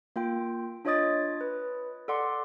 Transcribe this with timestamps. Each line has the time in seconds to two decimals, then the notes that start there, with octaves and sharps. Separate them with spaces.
0.16 A#3 F4 G5
0.85 D4 F4 C#5 D#5 D#6 A6
1.41 B4
2.08 A4 D5 F#5 C6 D6